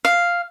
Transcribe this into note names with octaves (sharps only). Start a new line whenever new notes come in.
F5